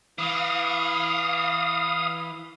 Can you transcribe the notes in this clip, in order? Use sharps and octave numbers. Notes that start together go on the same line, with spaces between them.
E3 F5 D#6